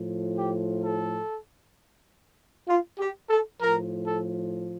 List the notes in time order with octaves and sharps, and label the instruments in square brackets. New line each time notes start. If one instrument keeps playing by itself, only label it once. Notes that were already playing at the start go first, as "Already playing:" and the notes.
Already playing: [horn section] A2 F3
G4
A4
F4
G4
A4
A2 F3 A#4
A4